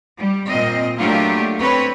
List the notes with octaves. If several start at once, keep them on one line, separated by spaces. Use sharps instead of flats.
G3
A#2 C4 D#5
F#3 A3 A#3 D4 F4 G4
C4 B4 C#5